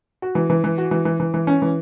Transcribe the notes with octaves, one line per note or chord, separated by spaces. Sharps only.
F#4
E3
E3
E3
F#4
E3
E3
E3
E3
C#4
E3